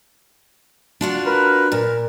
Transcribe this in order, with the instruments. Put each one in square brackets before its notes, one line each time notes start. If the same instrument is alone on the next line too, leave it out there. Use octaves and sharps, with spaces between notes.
[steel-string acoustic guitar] D4 F4 F#4
[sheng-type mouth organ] A#4 B4
[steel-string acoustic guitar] A#2 [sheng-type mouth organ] A#4